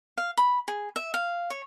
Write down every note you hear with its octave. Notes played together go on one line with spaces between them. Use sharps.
F5
B5
G#4
E5
F5
C#5